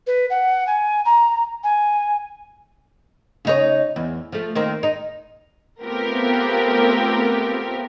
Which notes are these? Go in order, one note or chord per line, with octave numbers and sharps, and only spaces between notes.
B4
F#5
G#5
A#5
G#5
C#3 D#4 C#5
E2
F3 A3
D#3 A#3 C4
D#4
A3 B3 C4 F4 G4 A#4